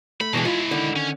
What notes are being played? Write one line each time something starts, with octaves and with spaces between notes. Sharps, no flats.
A3 B5
B2 E3 G#3 D4 F#4
G#3 E4 F4
D3 D#3
C#4